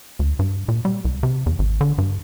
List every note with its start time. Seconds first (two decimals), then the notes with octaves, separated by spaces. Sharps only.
0.19 D2
0.39 G2
0.68 A#2
0.85 G3
1.05 C2
1.23 C3
1.46 E2
1.59 G#1
1.81 D3
1.98 G2